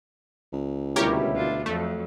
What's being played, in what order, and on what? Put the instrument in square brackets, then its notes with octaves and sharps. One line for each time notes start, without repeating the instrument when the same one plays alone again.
[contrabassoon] C#2
[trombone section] D2 B2 E4 [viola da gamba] G3 [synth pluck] G4 A#4 C#5
[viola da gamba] D4 F4
[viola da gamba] F2 F#3 [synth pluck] A3